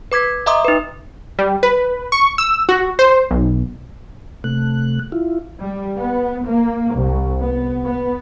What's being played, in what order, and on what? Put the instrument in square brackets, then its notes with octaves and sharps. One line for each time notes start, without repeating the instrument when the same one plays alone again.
[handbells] B4 D6 G#6 B6
D#5 E5 A#5 C6 D6 D#6
D#4 B4
[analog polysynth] G3
B4
C#6
E6
F#4
C5
B1
[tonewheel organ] C3 A3 F#6
E4 F4
[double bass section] G3
B3
A#3
C2
B3
B3